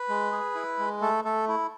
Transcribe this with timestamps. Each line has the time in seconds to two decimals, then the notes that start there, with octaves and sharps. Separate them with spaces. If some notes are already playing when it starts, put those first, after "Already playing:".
Already playing: B4
0.09 G#3
0.32 G#4
0.55 E4
0.79 G#3
1.01 A3 A4
1.24 A3 A4
1.48 E4